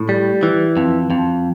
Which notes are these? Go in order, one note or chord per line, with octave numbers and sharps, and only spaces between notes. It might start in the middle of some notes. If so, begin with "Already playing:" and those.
Already playing: A2
G3
E3
F2
F2